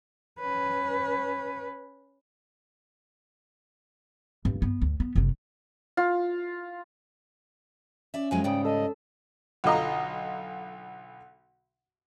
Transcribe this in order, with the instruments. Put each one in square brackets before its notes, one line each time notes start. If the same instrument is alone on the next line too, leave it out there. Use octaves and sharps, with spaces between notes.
[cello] C#4 B4
[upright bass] G2
B3
D2
B3
F#1 C3
[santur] F4
[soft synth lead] C#4 [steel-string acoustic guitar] D5 E5
[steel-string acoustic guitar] F2 F#3 G#3 [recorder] G#5
[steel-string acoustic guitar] G#2 C#3 G3 [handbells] D5 D#6 [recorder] G5
[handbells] A4 A5 [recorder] D#5
[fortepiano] B1 D3 F4 D#5 A#5